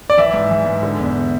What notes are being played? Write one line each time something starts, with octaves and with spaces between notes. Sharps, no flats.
D5
E3 E5
G#2
E3
G#2
D3
E2